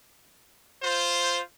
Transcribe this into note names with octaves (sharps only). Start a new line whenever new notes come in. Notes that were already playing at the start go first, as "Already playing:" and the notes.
F4 C5